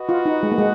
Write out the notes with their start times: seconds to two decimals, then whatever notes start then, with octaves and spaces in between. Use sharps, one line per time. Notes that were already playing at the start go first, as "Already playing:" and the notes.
Already playing: F#4 B4 D#5 F#5
0.09 F4
0.26 D#4
0.43 G#3
0.52 A#3
0.58 G#3